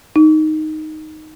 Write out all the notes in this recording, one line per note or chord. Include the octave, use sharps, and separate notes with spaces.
D#4